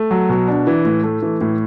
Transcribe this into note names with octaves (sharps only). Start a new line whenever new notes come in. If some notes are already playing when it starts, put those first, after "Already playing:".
Already playing: A3
F#3
B2
D4
E3
A2
A3
E3
A2